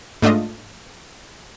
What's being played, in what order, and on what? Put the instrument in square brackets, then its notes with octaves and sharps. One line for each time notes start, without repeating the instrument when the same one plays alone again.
[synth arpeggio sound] G#2 A3 D4 F4 D#5